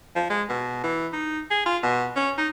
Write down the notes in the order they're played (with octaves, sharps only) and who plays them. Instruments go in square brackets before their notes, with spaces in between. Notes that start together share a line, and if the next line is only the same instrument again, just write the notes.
[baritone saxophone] F3
G#3
B2
E3
D#4
G#4
F4
B2
C#4
D#4